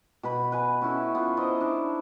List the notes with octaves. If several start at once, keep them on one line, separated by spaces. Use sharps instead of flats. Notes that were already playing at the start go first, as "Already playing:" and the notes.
B2 B4 B5
B4 G#5
C#4 E4 F#4 A4
B3 F4
D#4 E4 C5 D#5
D4